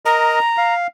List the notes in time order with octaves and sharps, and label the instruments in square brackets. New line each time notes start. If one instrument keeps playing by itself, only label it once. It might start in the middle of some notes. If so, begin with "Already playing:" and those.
[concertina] A#4 D#5 [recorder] A#5
[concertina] F5